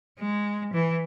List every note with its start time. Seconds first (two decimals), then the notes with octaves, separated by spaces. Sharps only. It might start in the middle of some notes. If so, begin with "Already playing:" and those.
0.19 G#3
0.73 E3